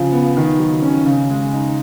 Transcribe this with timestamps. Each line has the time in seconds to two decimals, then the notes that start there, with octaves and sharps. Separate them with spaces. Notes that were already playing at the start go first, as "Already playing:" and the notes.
Already playing: C#3 F3
0.12 B3
0.37 D#3
0.59 F#3
0.82 C#4
1.06 C#3
1.30 G#3
1.53 D#4